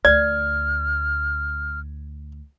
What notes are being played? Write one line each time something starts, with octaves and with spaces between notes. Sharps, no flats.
D2 D5 F6 G#6